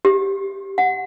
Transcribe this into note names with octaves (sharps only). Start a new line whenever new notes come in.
G4
F#5